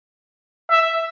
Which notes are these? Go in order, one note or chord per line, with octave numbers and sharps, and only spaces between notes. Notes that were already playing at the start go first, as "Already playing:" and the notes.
E5